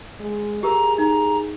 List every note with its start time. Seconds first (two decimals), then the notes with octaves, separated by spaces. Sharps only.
0.20 G#3
0.63 G4 G#4 A#4 A#5
0.98 D#4 A#5